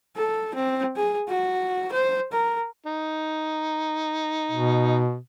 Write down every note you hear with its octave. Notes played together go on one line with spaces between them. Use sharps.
A4
C4
G#4
F#4
C5
A#4
D#4
B2